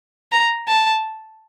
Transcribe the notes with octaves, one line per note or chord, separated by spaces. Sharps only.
A#5
A5